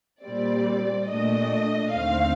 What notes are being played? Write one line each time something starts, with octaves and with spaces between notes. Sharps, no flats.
A#2 G3 C4 D5
A#2 A3 D4 D#5
D#2 D3 A3 C4 F5